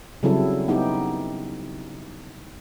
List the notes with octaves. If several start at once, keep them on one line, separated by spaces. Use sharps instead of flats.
C#3 F#3 G3 C4 E4 A4
B3 D#4 E4 G4